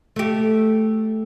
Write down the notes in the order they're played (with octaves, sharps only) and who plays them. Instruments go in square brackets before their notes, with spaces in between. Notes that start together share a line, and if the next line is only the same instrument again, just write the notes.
[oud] A3 G4